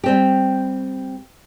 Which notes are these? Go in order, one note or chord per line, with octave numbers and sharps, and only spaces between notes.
G3 C4 G4